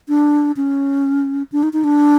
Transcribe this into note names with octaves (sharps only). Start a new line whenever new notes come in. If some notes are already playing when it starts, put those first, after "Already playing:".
D4
C#4
D4
D#4
D#4
D4